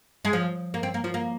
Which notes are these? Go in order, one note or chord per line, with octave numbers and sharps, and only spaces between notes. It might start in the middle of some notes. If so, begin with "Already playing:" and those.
G#3
F3
A#3
C4
A#3
F3
A#3